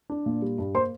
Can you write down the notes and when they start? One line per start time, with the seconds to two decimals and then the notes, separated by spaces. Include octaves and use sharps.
0.10 D4
0.26 A#2
0.42 G3
0.58 G2
0.74 A#3 C5 C6